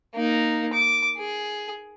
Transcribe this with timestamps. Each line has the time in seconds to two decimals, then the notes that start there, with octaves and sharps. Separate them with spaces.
0.15 A#3 D#4
0.73 D6
1.18 G#4